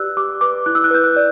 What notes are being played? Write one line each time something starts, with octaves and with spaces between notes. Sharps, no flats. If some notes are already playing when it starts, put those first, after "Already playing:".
Already playing: G4 B4 D5 E6 F#6
G4 D6
B4 D6
E4 F#6
E6
F#6
B4 G6
F#6
D5